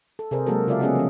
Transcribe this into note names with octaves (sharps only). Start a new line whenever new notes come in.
A4
C3 G#4 A#4 C5 D5
F#3 G#3 A#3 F#4 A4 A#4
C#3 F4 A#4 D5 E5 F5
B3 C#4 G#4 D5 D#5 F#5
F3 C#4